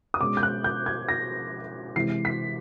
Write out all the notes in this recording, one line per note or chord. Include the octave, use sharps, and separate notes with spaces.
D#6
B2 G#3 C#4 D6
G6
F#6
G6
G#6
A#6
C3 E3 G#3 C7
B6